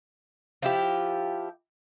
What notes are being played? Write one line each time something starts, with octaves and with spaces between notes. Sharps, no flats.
F3 E4 G4